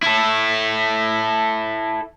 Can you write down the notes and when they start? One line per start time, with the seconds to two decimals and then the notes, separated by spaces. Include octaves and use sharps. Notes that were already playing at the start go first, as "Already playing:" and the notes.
0.02 E4 A4